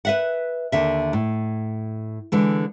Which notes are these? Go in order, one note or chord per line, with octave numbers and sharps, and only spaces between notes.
B4 E5 F#5
D#2 D3 E5
A2
D3 E3 G#3